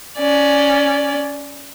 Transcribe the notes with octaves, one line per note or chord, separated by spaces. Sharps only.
C#4 D5